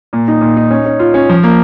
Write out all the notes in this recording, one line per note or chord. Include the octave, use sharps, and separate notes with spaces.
A#2
D#4
A#2
D#4
C#4
C#4
F4
C#4
F3
A#3